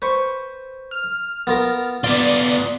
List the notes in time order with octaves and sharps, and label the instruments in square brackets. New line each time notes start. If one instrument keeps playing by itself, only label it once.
[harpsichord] B4 C5 C#6
[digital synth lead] F6
[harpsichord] B3 F4 A#4
[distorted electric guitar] B3 F4 [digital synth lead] D5 [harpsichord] F5